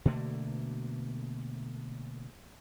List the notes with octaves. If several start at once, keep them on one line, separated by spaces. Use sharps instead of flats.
B2 D3 A3 A#3